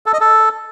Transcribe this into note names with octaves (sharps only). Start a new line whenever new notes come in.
A4
D#5
A4